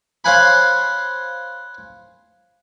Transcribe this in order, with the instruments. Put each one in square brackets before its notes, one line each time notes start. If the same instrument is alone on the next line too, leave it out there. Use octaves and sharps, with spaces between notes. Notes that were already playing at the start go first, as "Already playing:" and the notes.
[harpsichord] C5 C#5 F5 F#5 G#5 B5